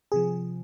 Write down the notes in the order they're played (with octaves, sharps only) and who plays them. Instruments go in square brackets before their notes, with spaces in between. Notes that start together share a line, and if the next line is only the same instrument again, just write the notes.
[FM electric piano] C3 F3 G#4